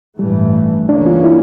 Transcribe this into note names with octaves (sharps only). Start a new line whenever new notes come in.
A1 G2 E3 G3 A3
C#2 C#3 E3 A#3 C#4 D4
F4
E4